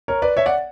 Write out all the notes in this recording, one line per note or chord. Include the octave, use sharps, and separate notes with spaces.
A#4 C#5
B4 D5
C#5 E5
D5 F#5